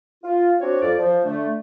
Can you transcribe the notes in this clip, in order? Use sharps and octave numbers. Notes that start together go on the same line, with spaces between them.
F4
C4 D4 F#4 C#5
F2 D5
F3
D3 A3